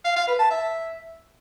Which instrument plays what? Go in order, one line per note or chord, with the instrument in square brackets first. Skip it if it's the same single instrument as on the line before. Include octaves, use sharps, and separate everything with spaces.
[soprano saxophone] F5
F5
B4
A5
E5